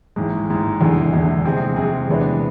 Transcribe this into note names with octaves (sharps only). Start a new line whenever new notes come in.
A1 G#2 G#3
A1 G#2 G#3
F1 E2 D3 G#3
F1 E2 D3 G#3
F2 C3 G#3 C4 G#4
F2 C3 G#3 C4 G#4
E2 C3 G#3 B3 D4